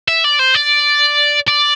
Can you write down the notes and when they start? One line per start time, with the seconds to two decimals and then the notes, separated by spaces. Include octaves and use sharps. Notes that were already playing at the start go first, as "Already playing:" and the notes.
0.08 E5
0.24 D5
0.39 C5
0.55 D5
1.48 D5